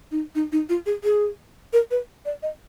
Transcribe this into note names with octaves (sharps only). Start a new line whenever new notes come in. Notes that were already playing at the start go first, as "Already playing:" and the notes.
D#4
D#4
D#4
F4
G#4
G#4
A#4
B4
D5
D#5